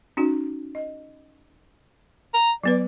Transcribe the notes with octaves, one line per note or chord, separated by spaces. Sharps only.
C#4 D#4 F#4
D#5
A#5
F#3 B3 B4 D5